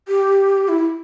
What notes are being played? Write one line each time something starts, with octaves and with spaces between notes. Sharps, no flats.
G4
E4